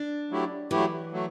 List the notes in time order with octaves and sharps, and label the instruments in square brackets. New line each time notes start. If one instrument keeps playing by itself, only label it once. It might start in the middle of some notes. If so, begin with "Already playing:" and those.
Already playing: [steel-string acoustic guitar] D4
[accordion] F#3 A3 E4 G4
[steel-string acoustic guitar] E3 [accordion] F#3 A3 E4 G4
[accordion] F#3 A3